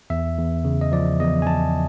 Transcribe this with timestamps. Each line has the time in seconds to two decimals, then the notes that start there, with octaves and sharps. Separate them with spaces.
0.10 E2 E5
0.38 E2
0.64 C#3
0.81 D#5
0.92 F3 D5
1.20 E2 D#5
1.42 G#5
1.47 E2 A5